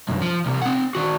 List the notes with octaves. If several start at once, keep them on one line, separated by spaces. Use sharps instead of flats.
C2 F#2
F3
C2 C3
C4 F#5
D#3 F#4